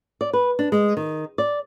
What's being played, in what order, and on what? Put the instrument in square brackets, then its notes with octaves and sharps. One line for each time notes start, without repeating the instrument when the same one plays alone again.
[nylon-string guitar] D5
B4
D4
G#3
D#3
D5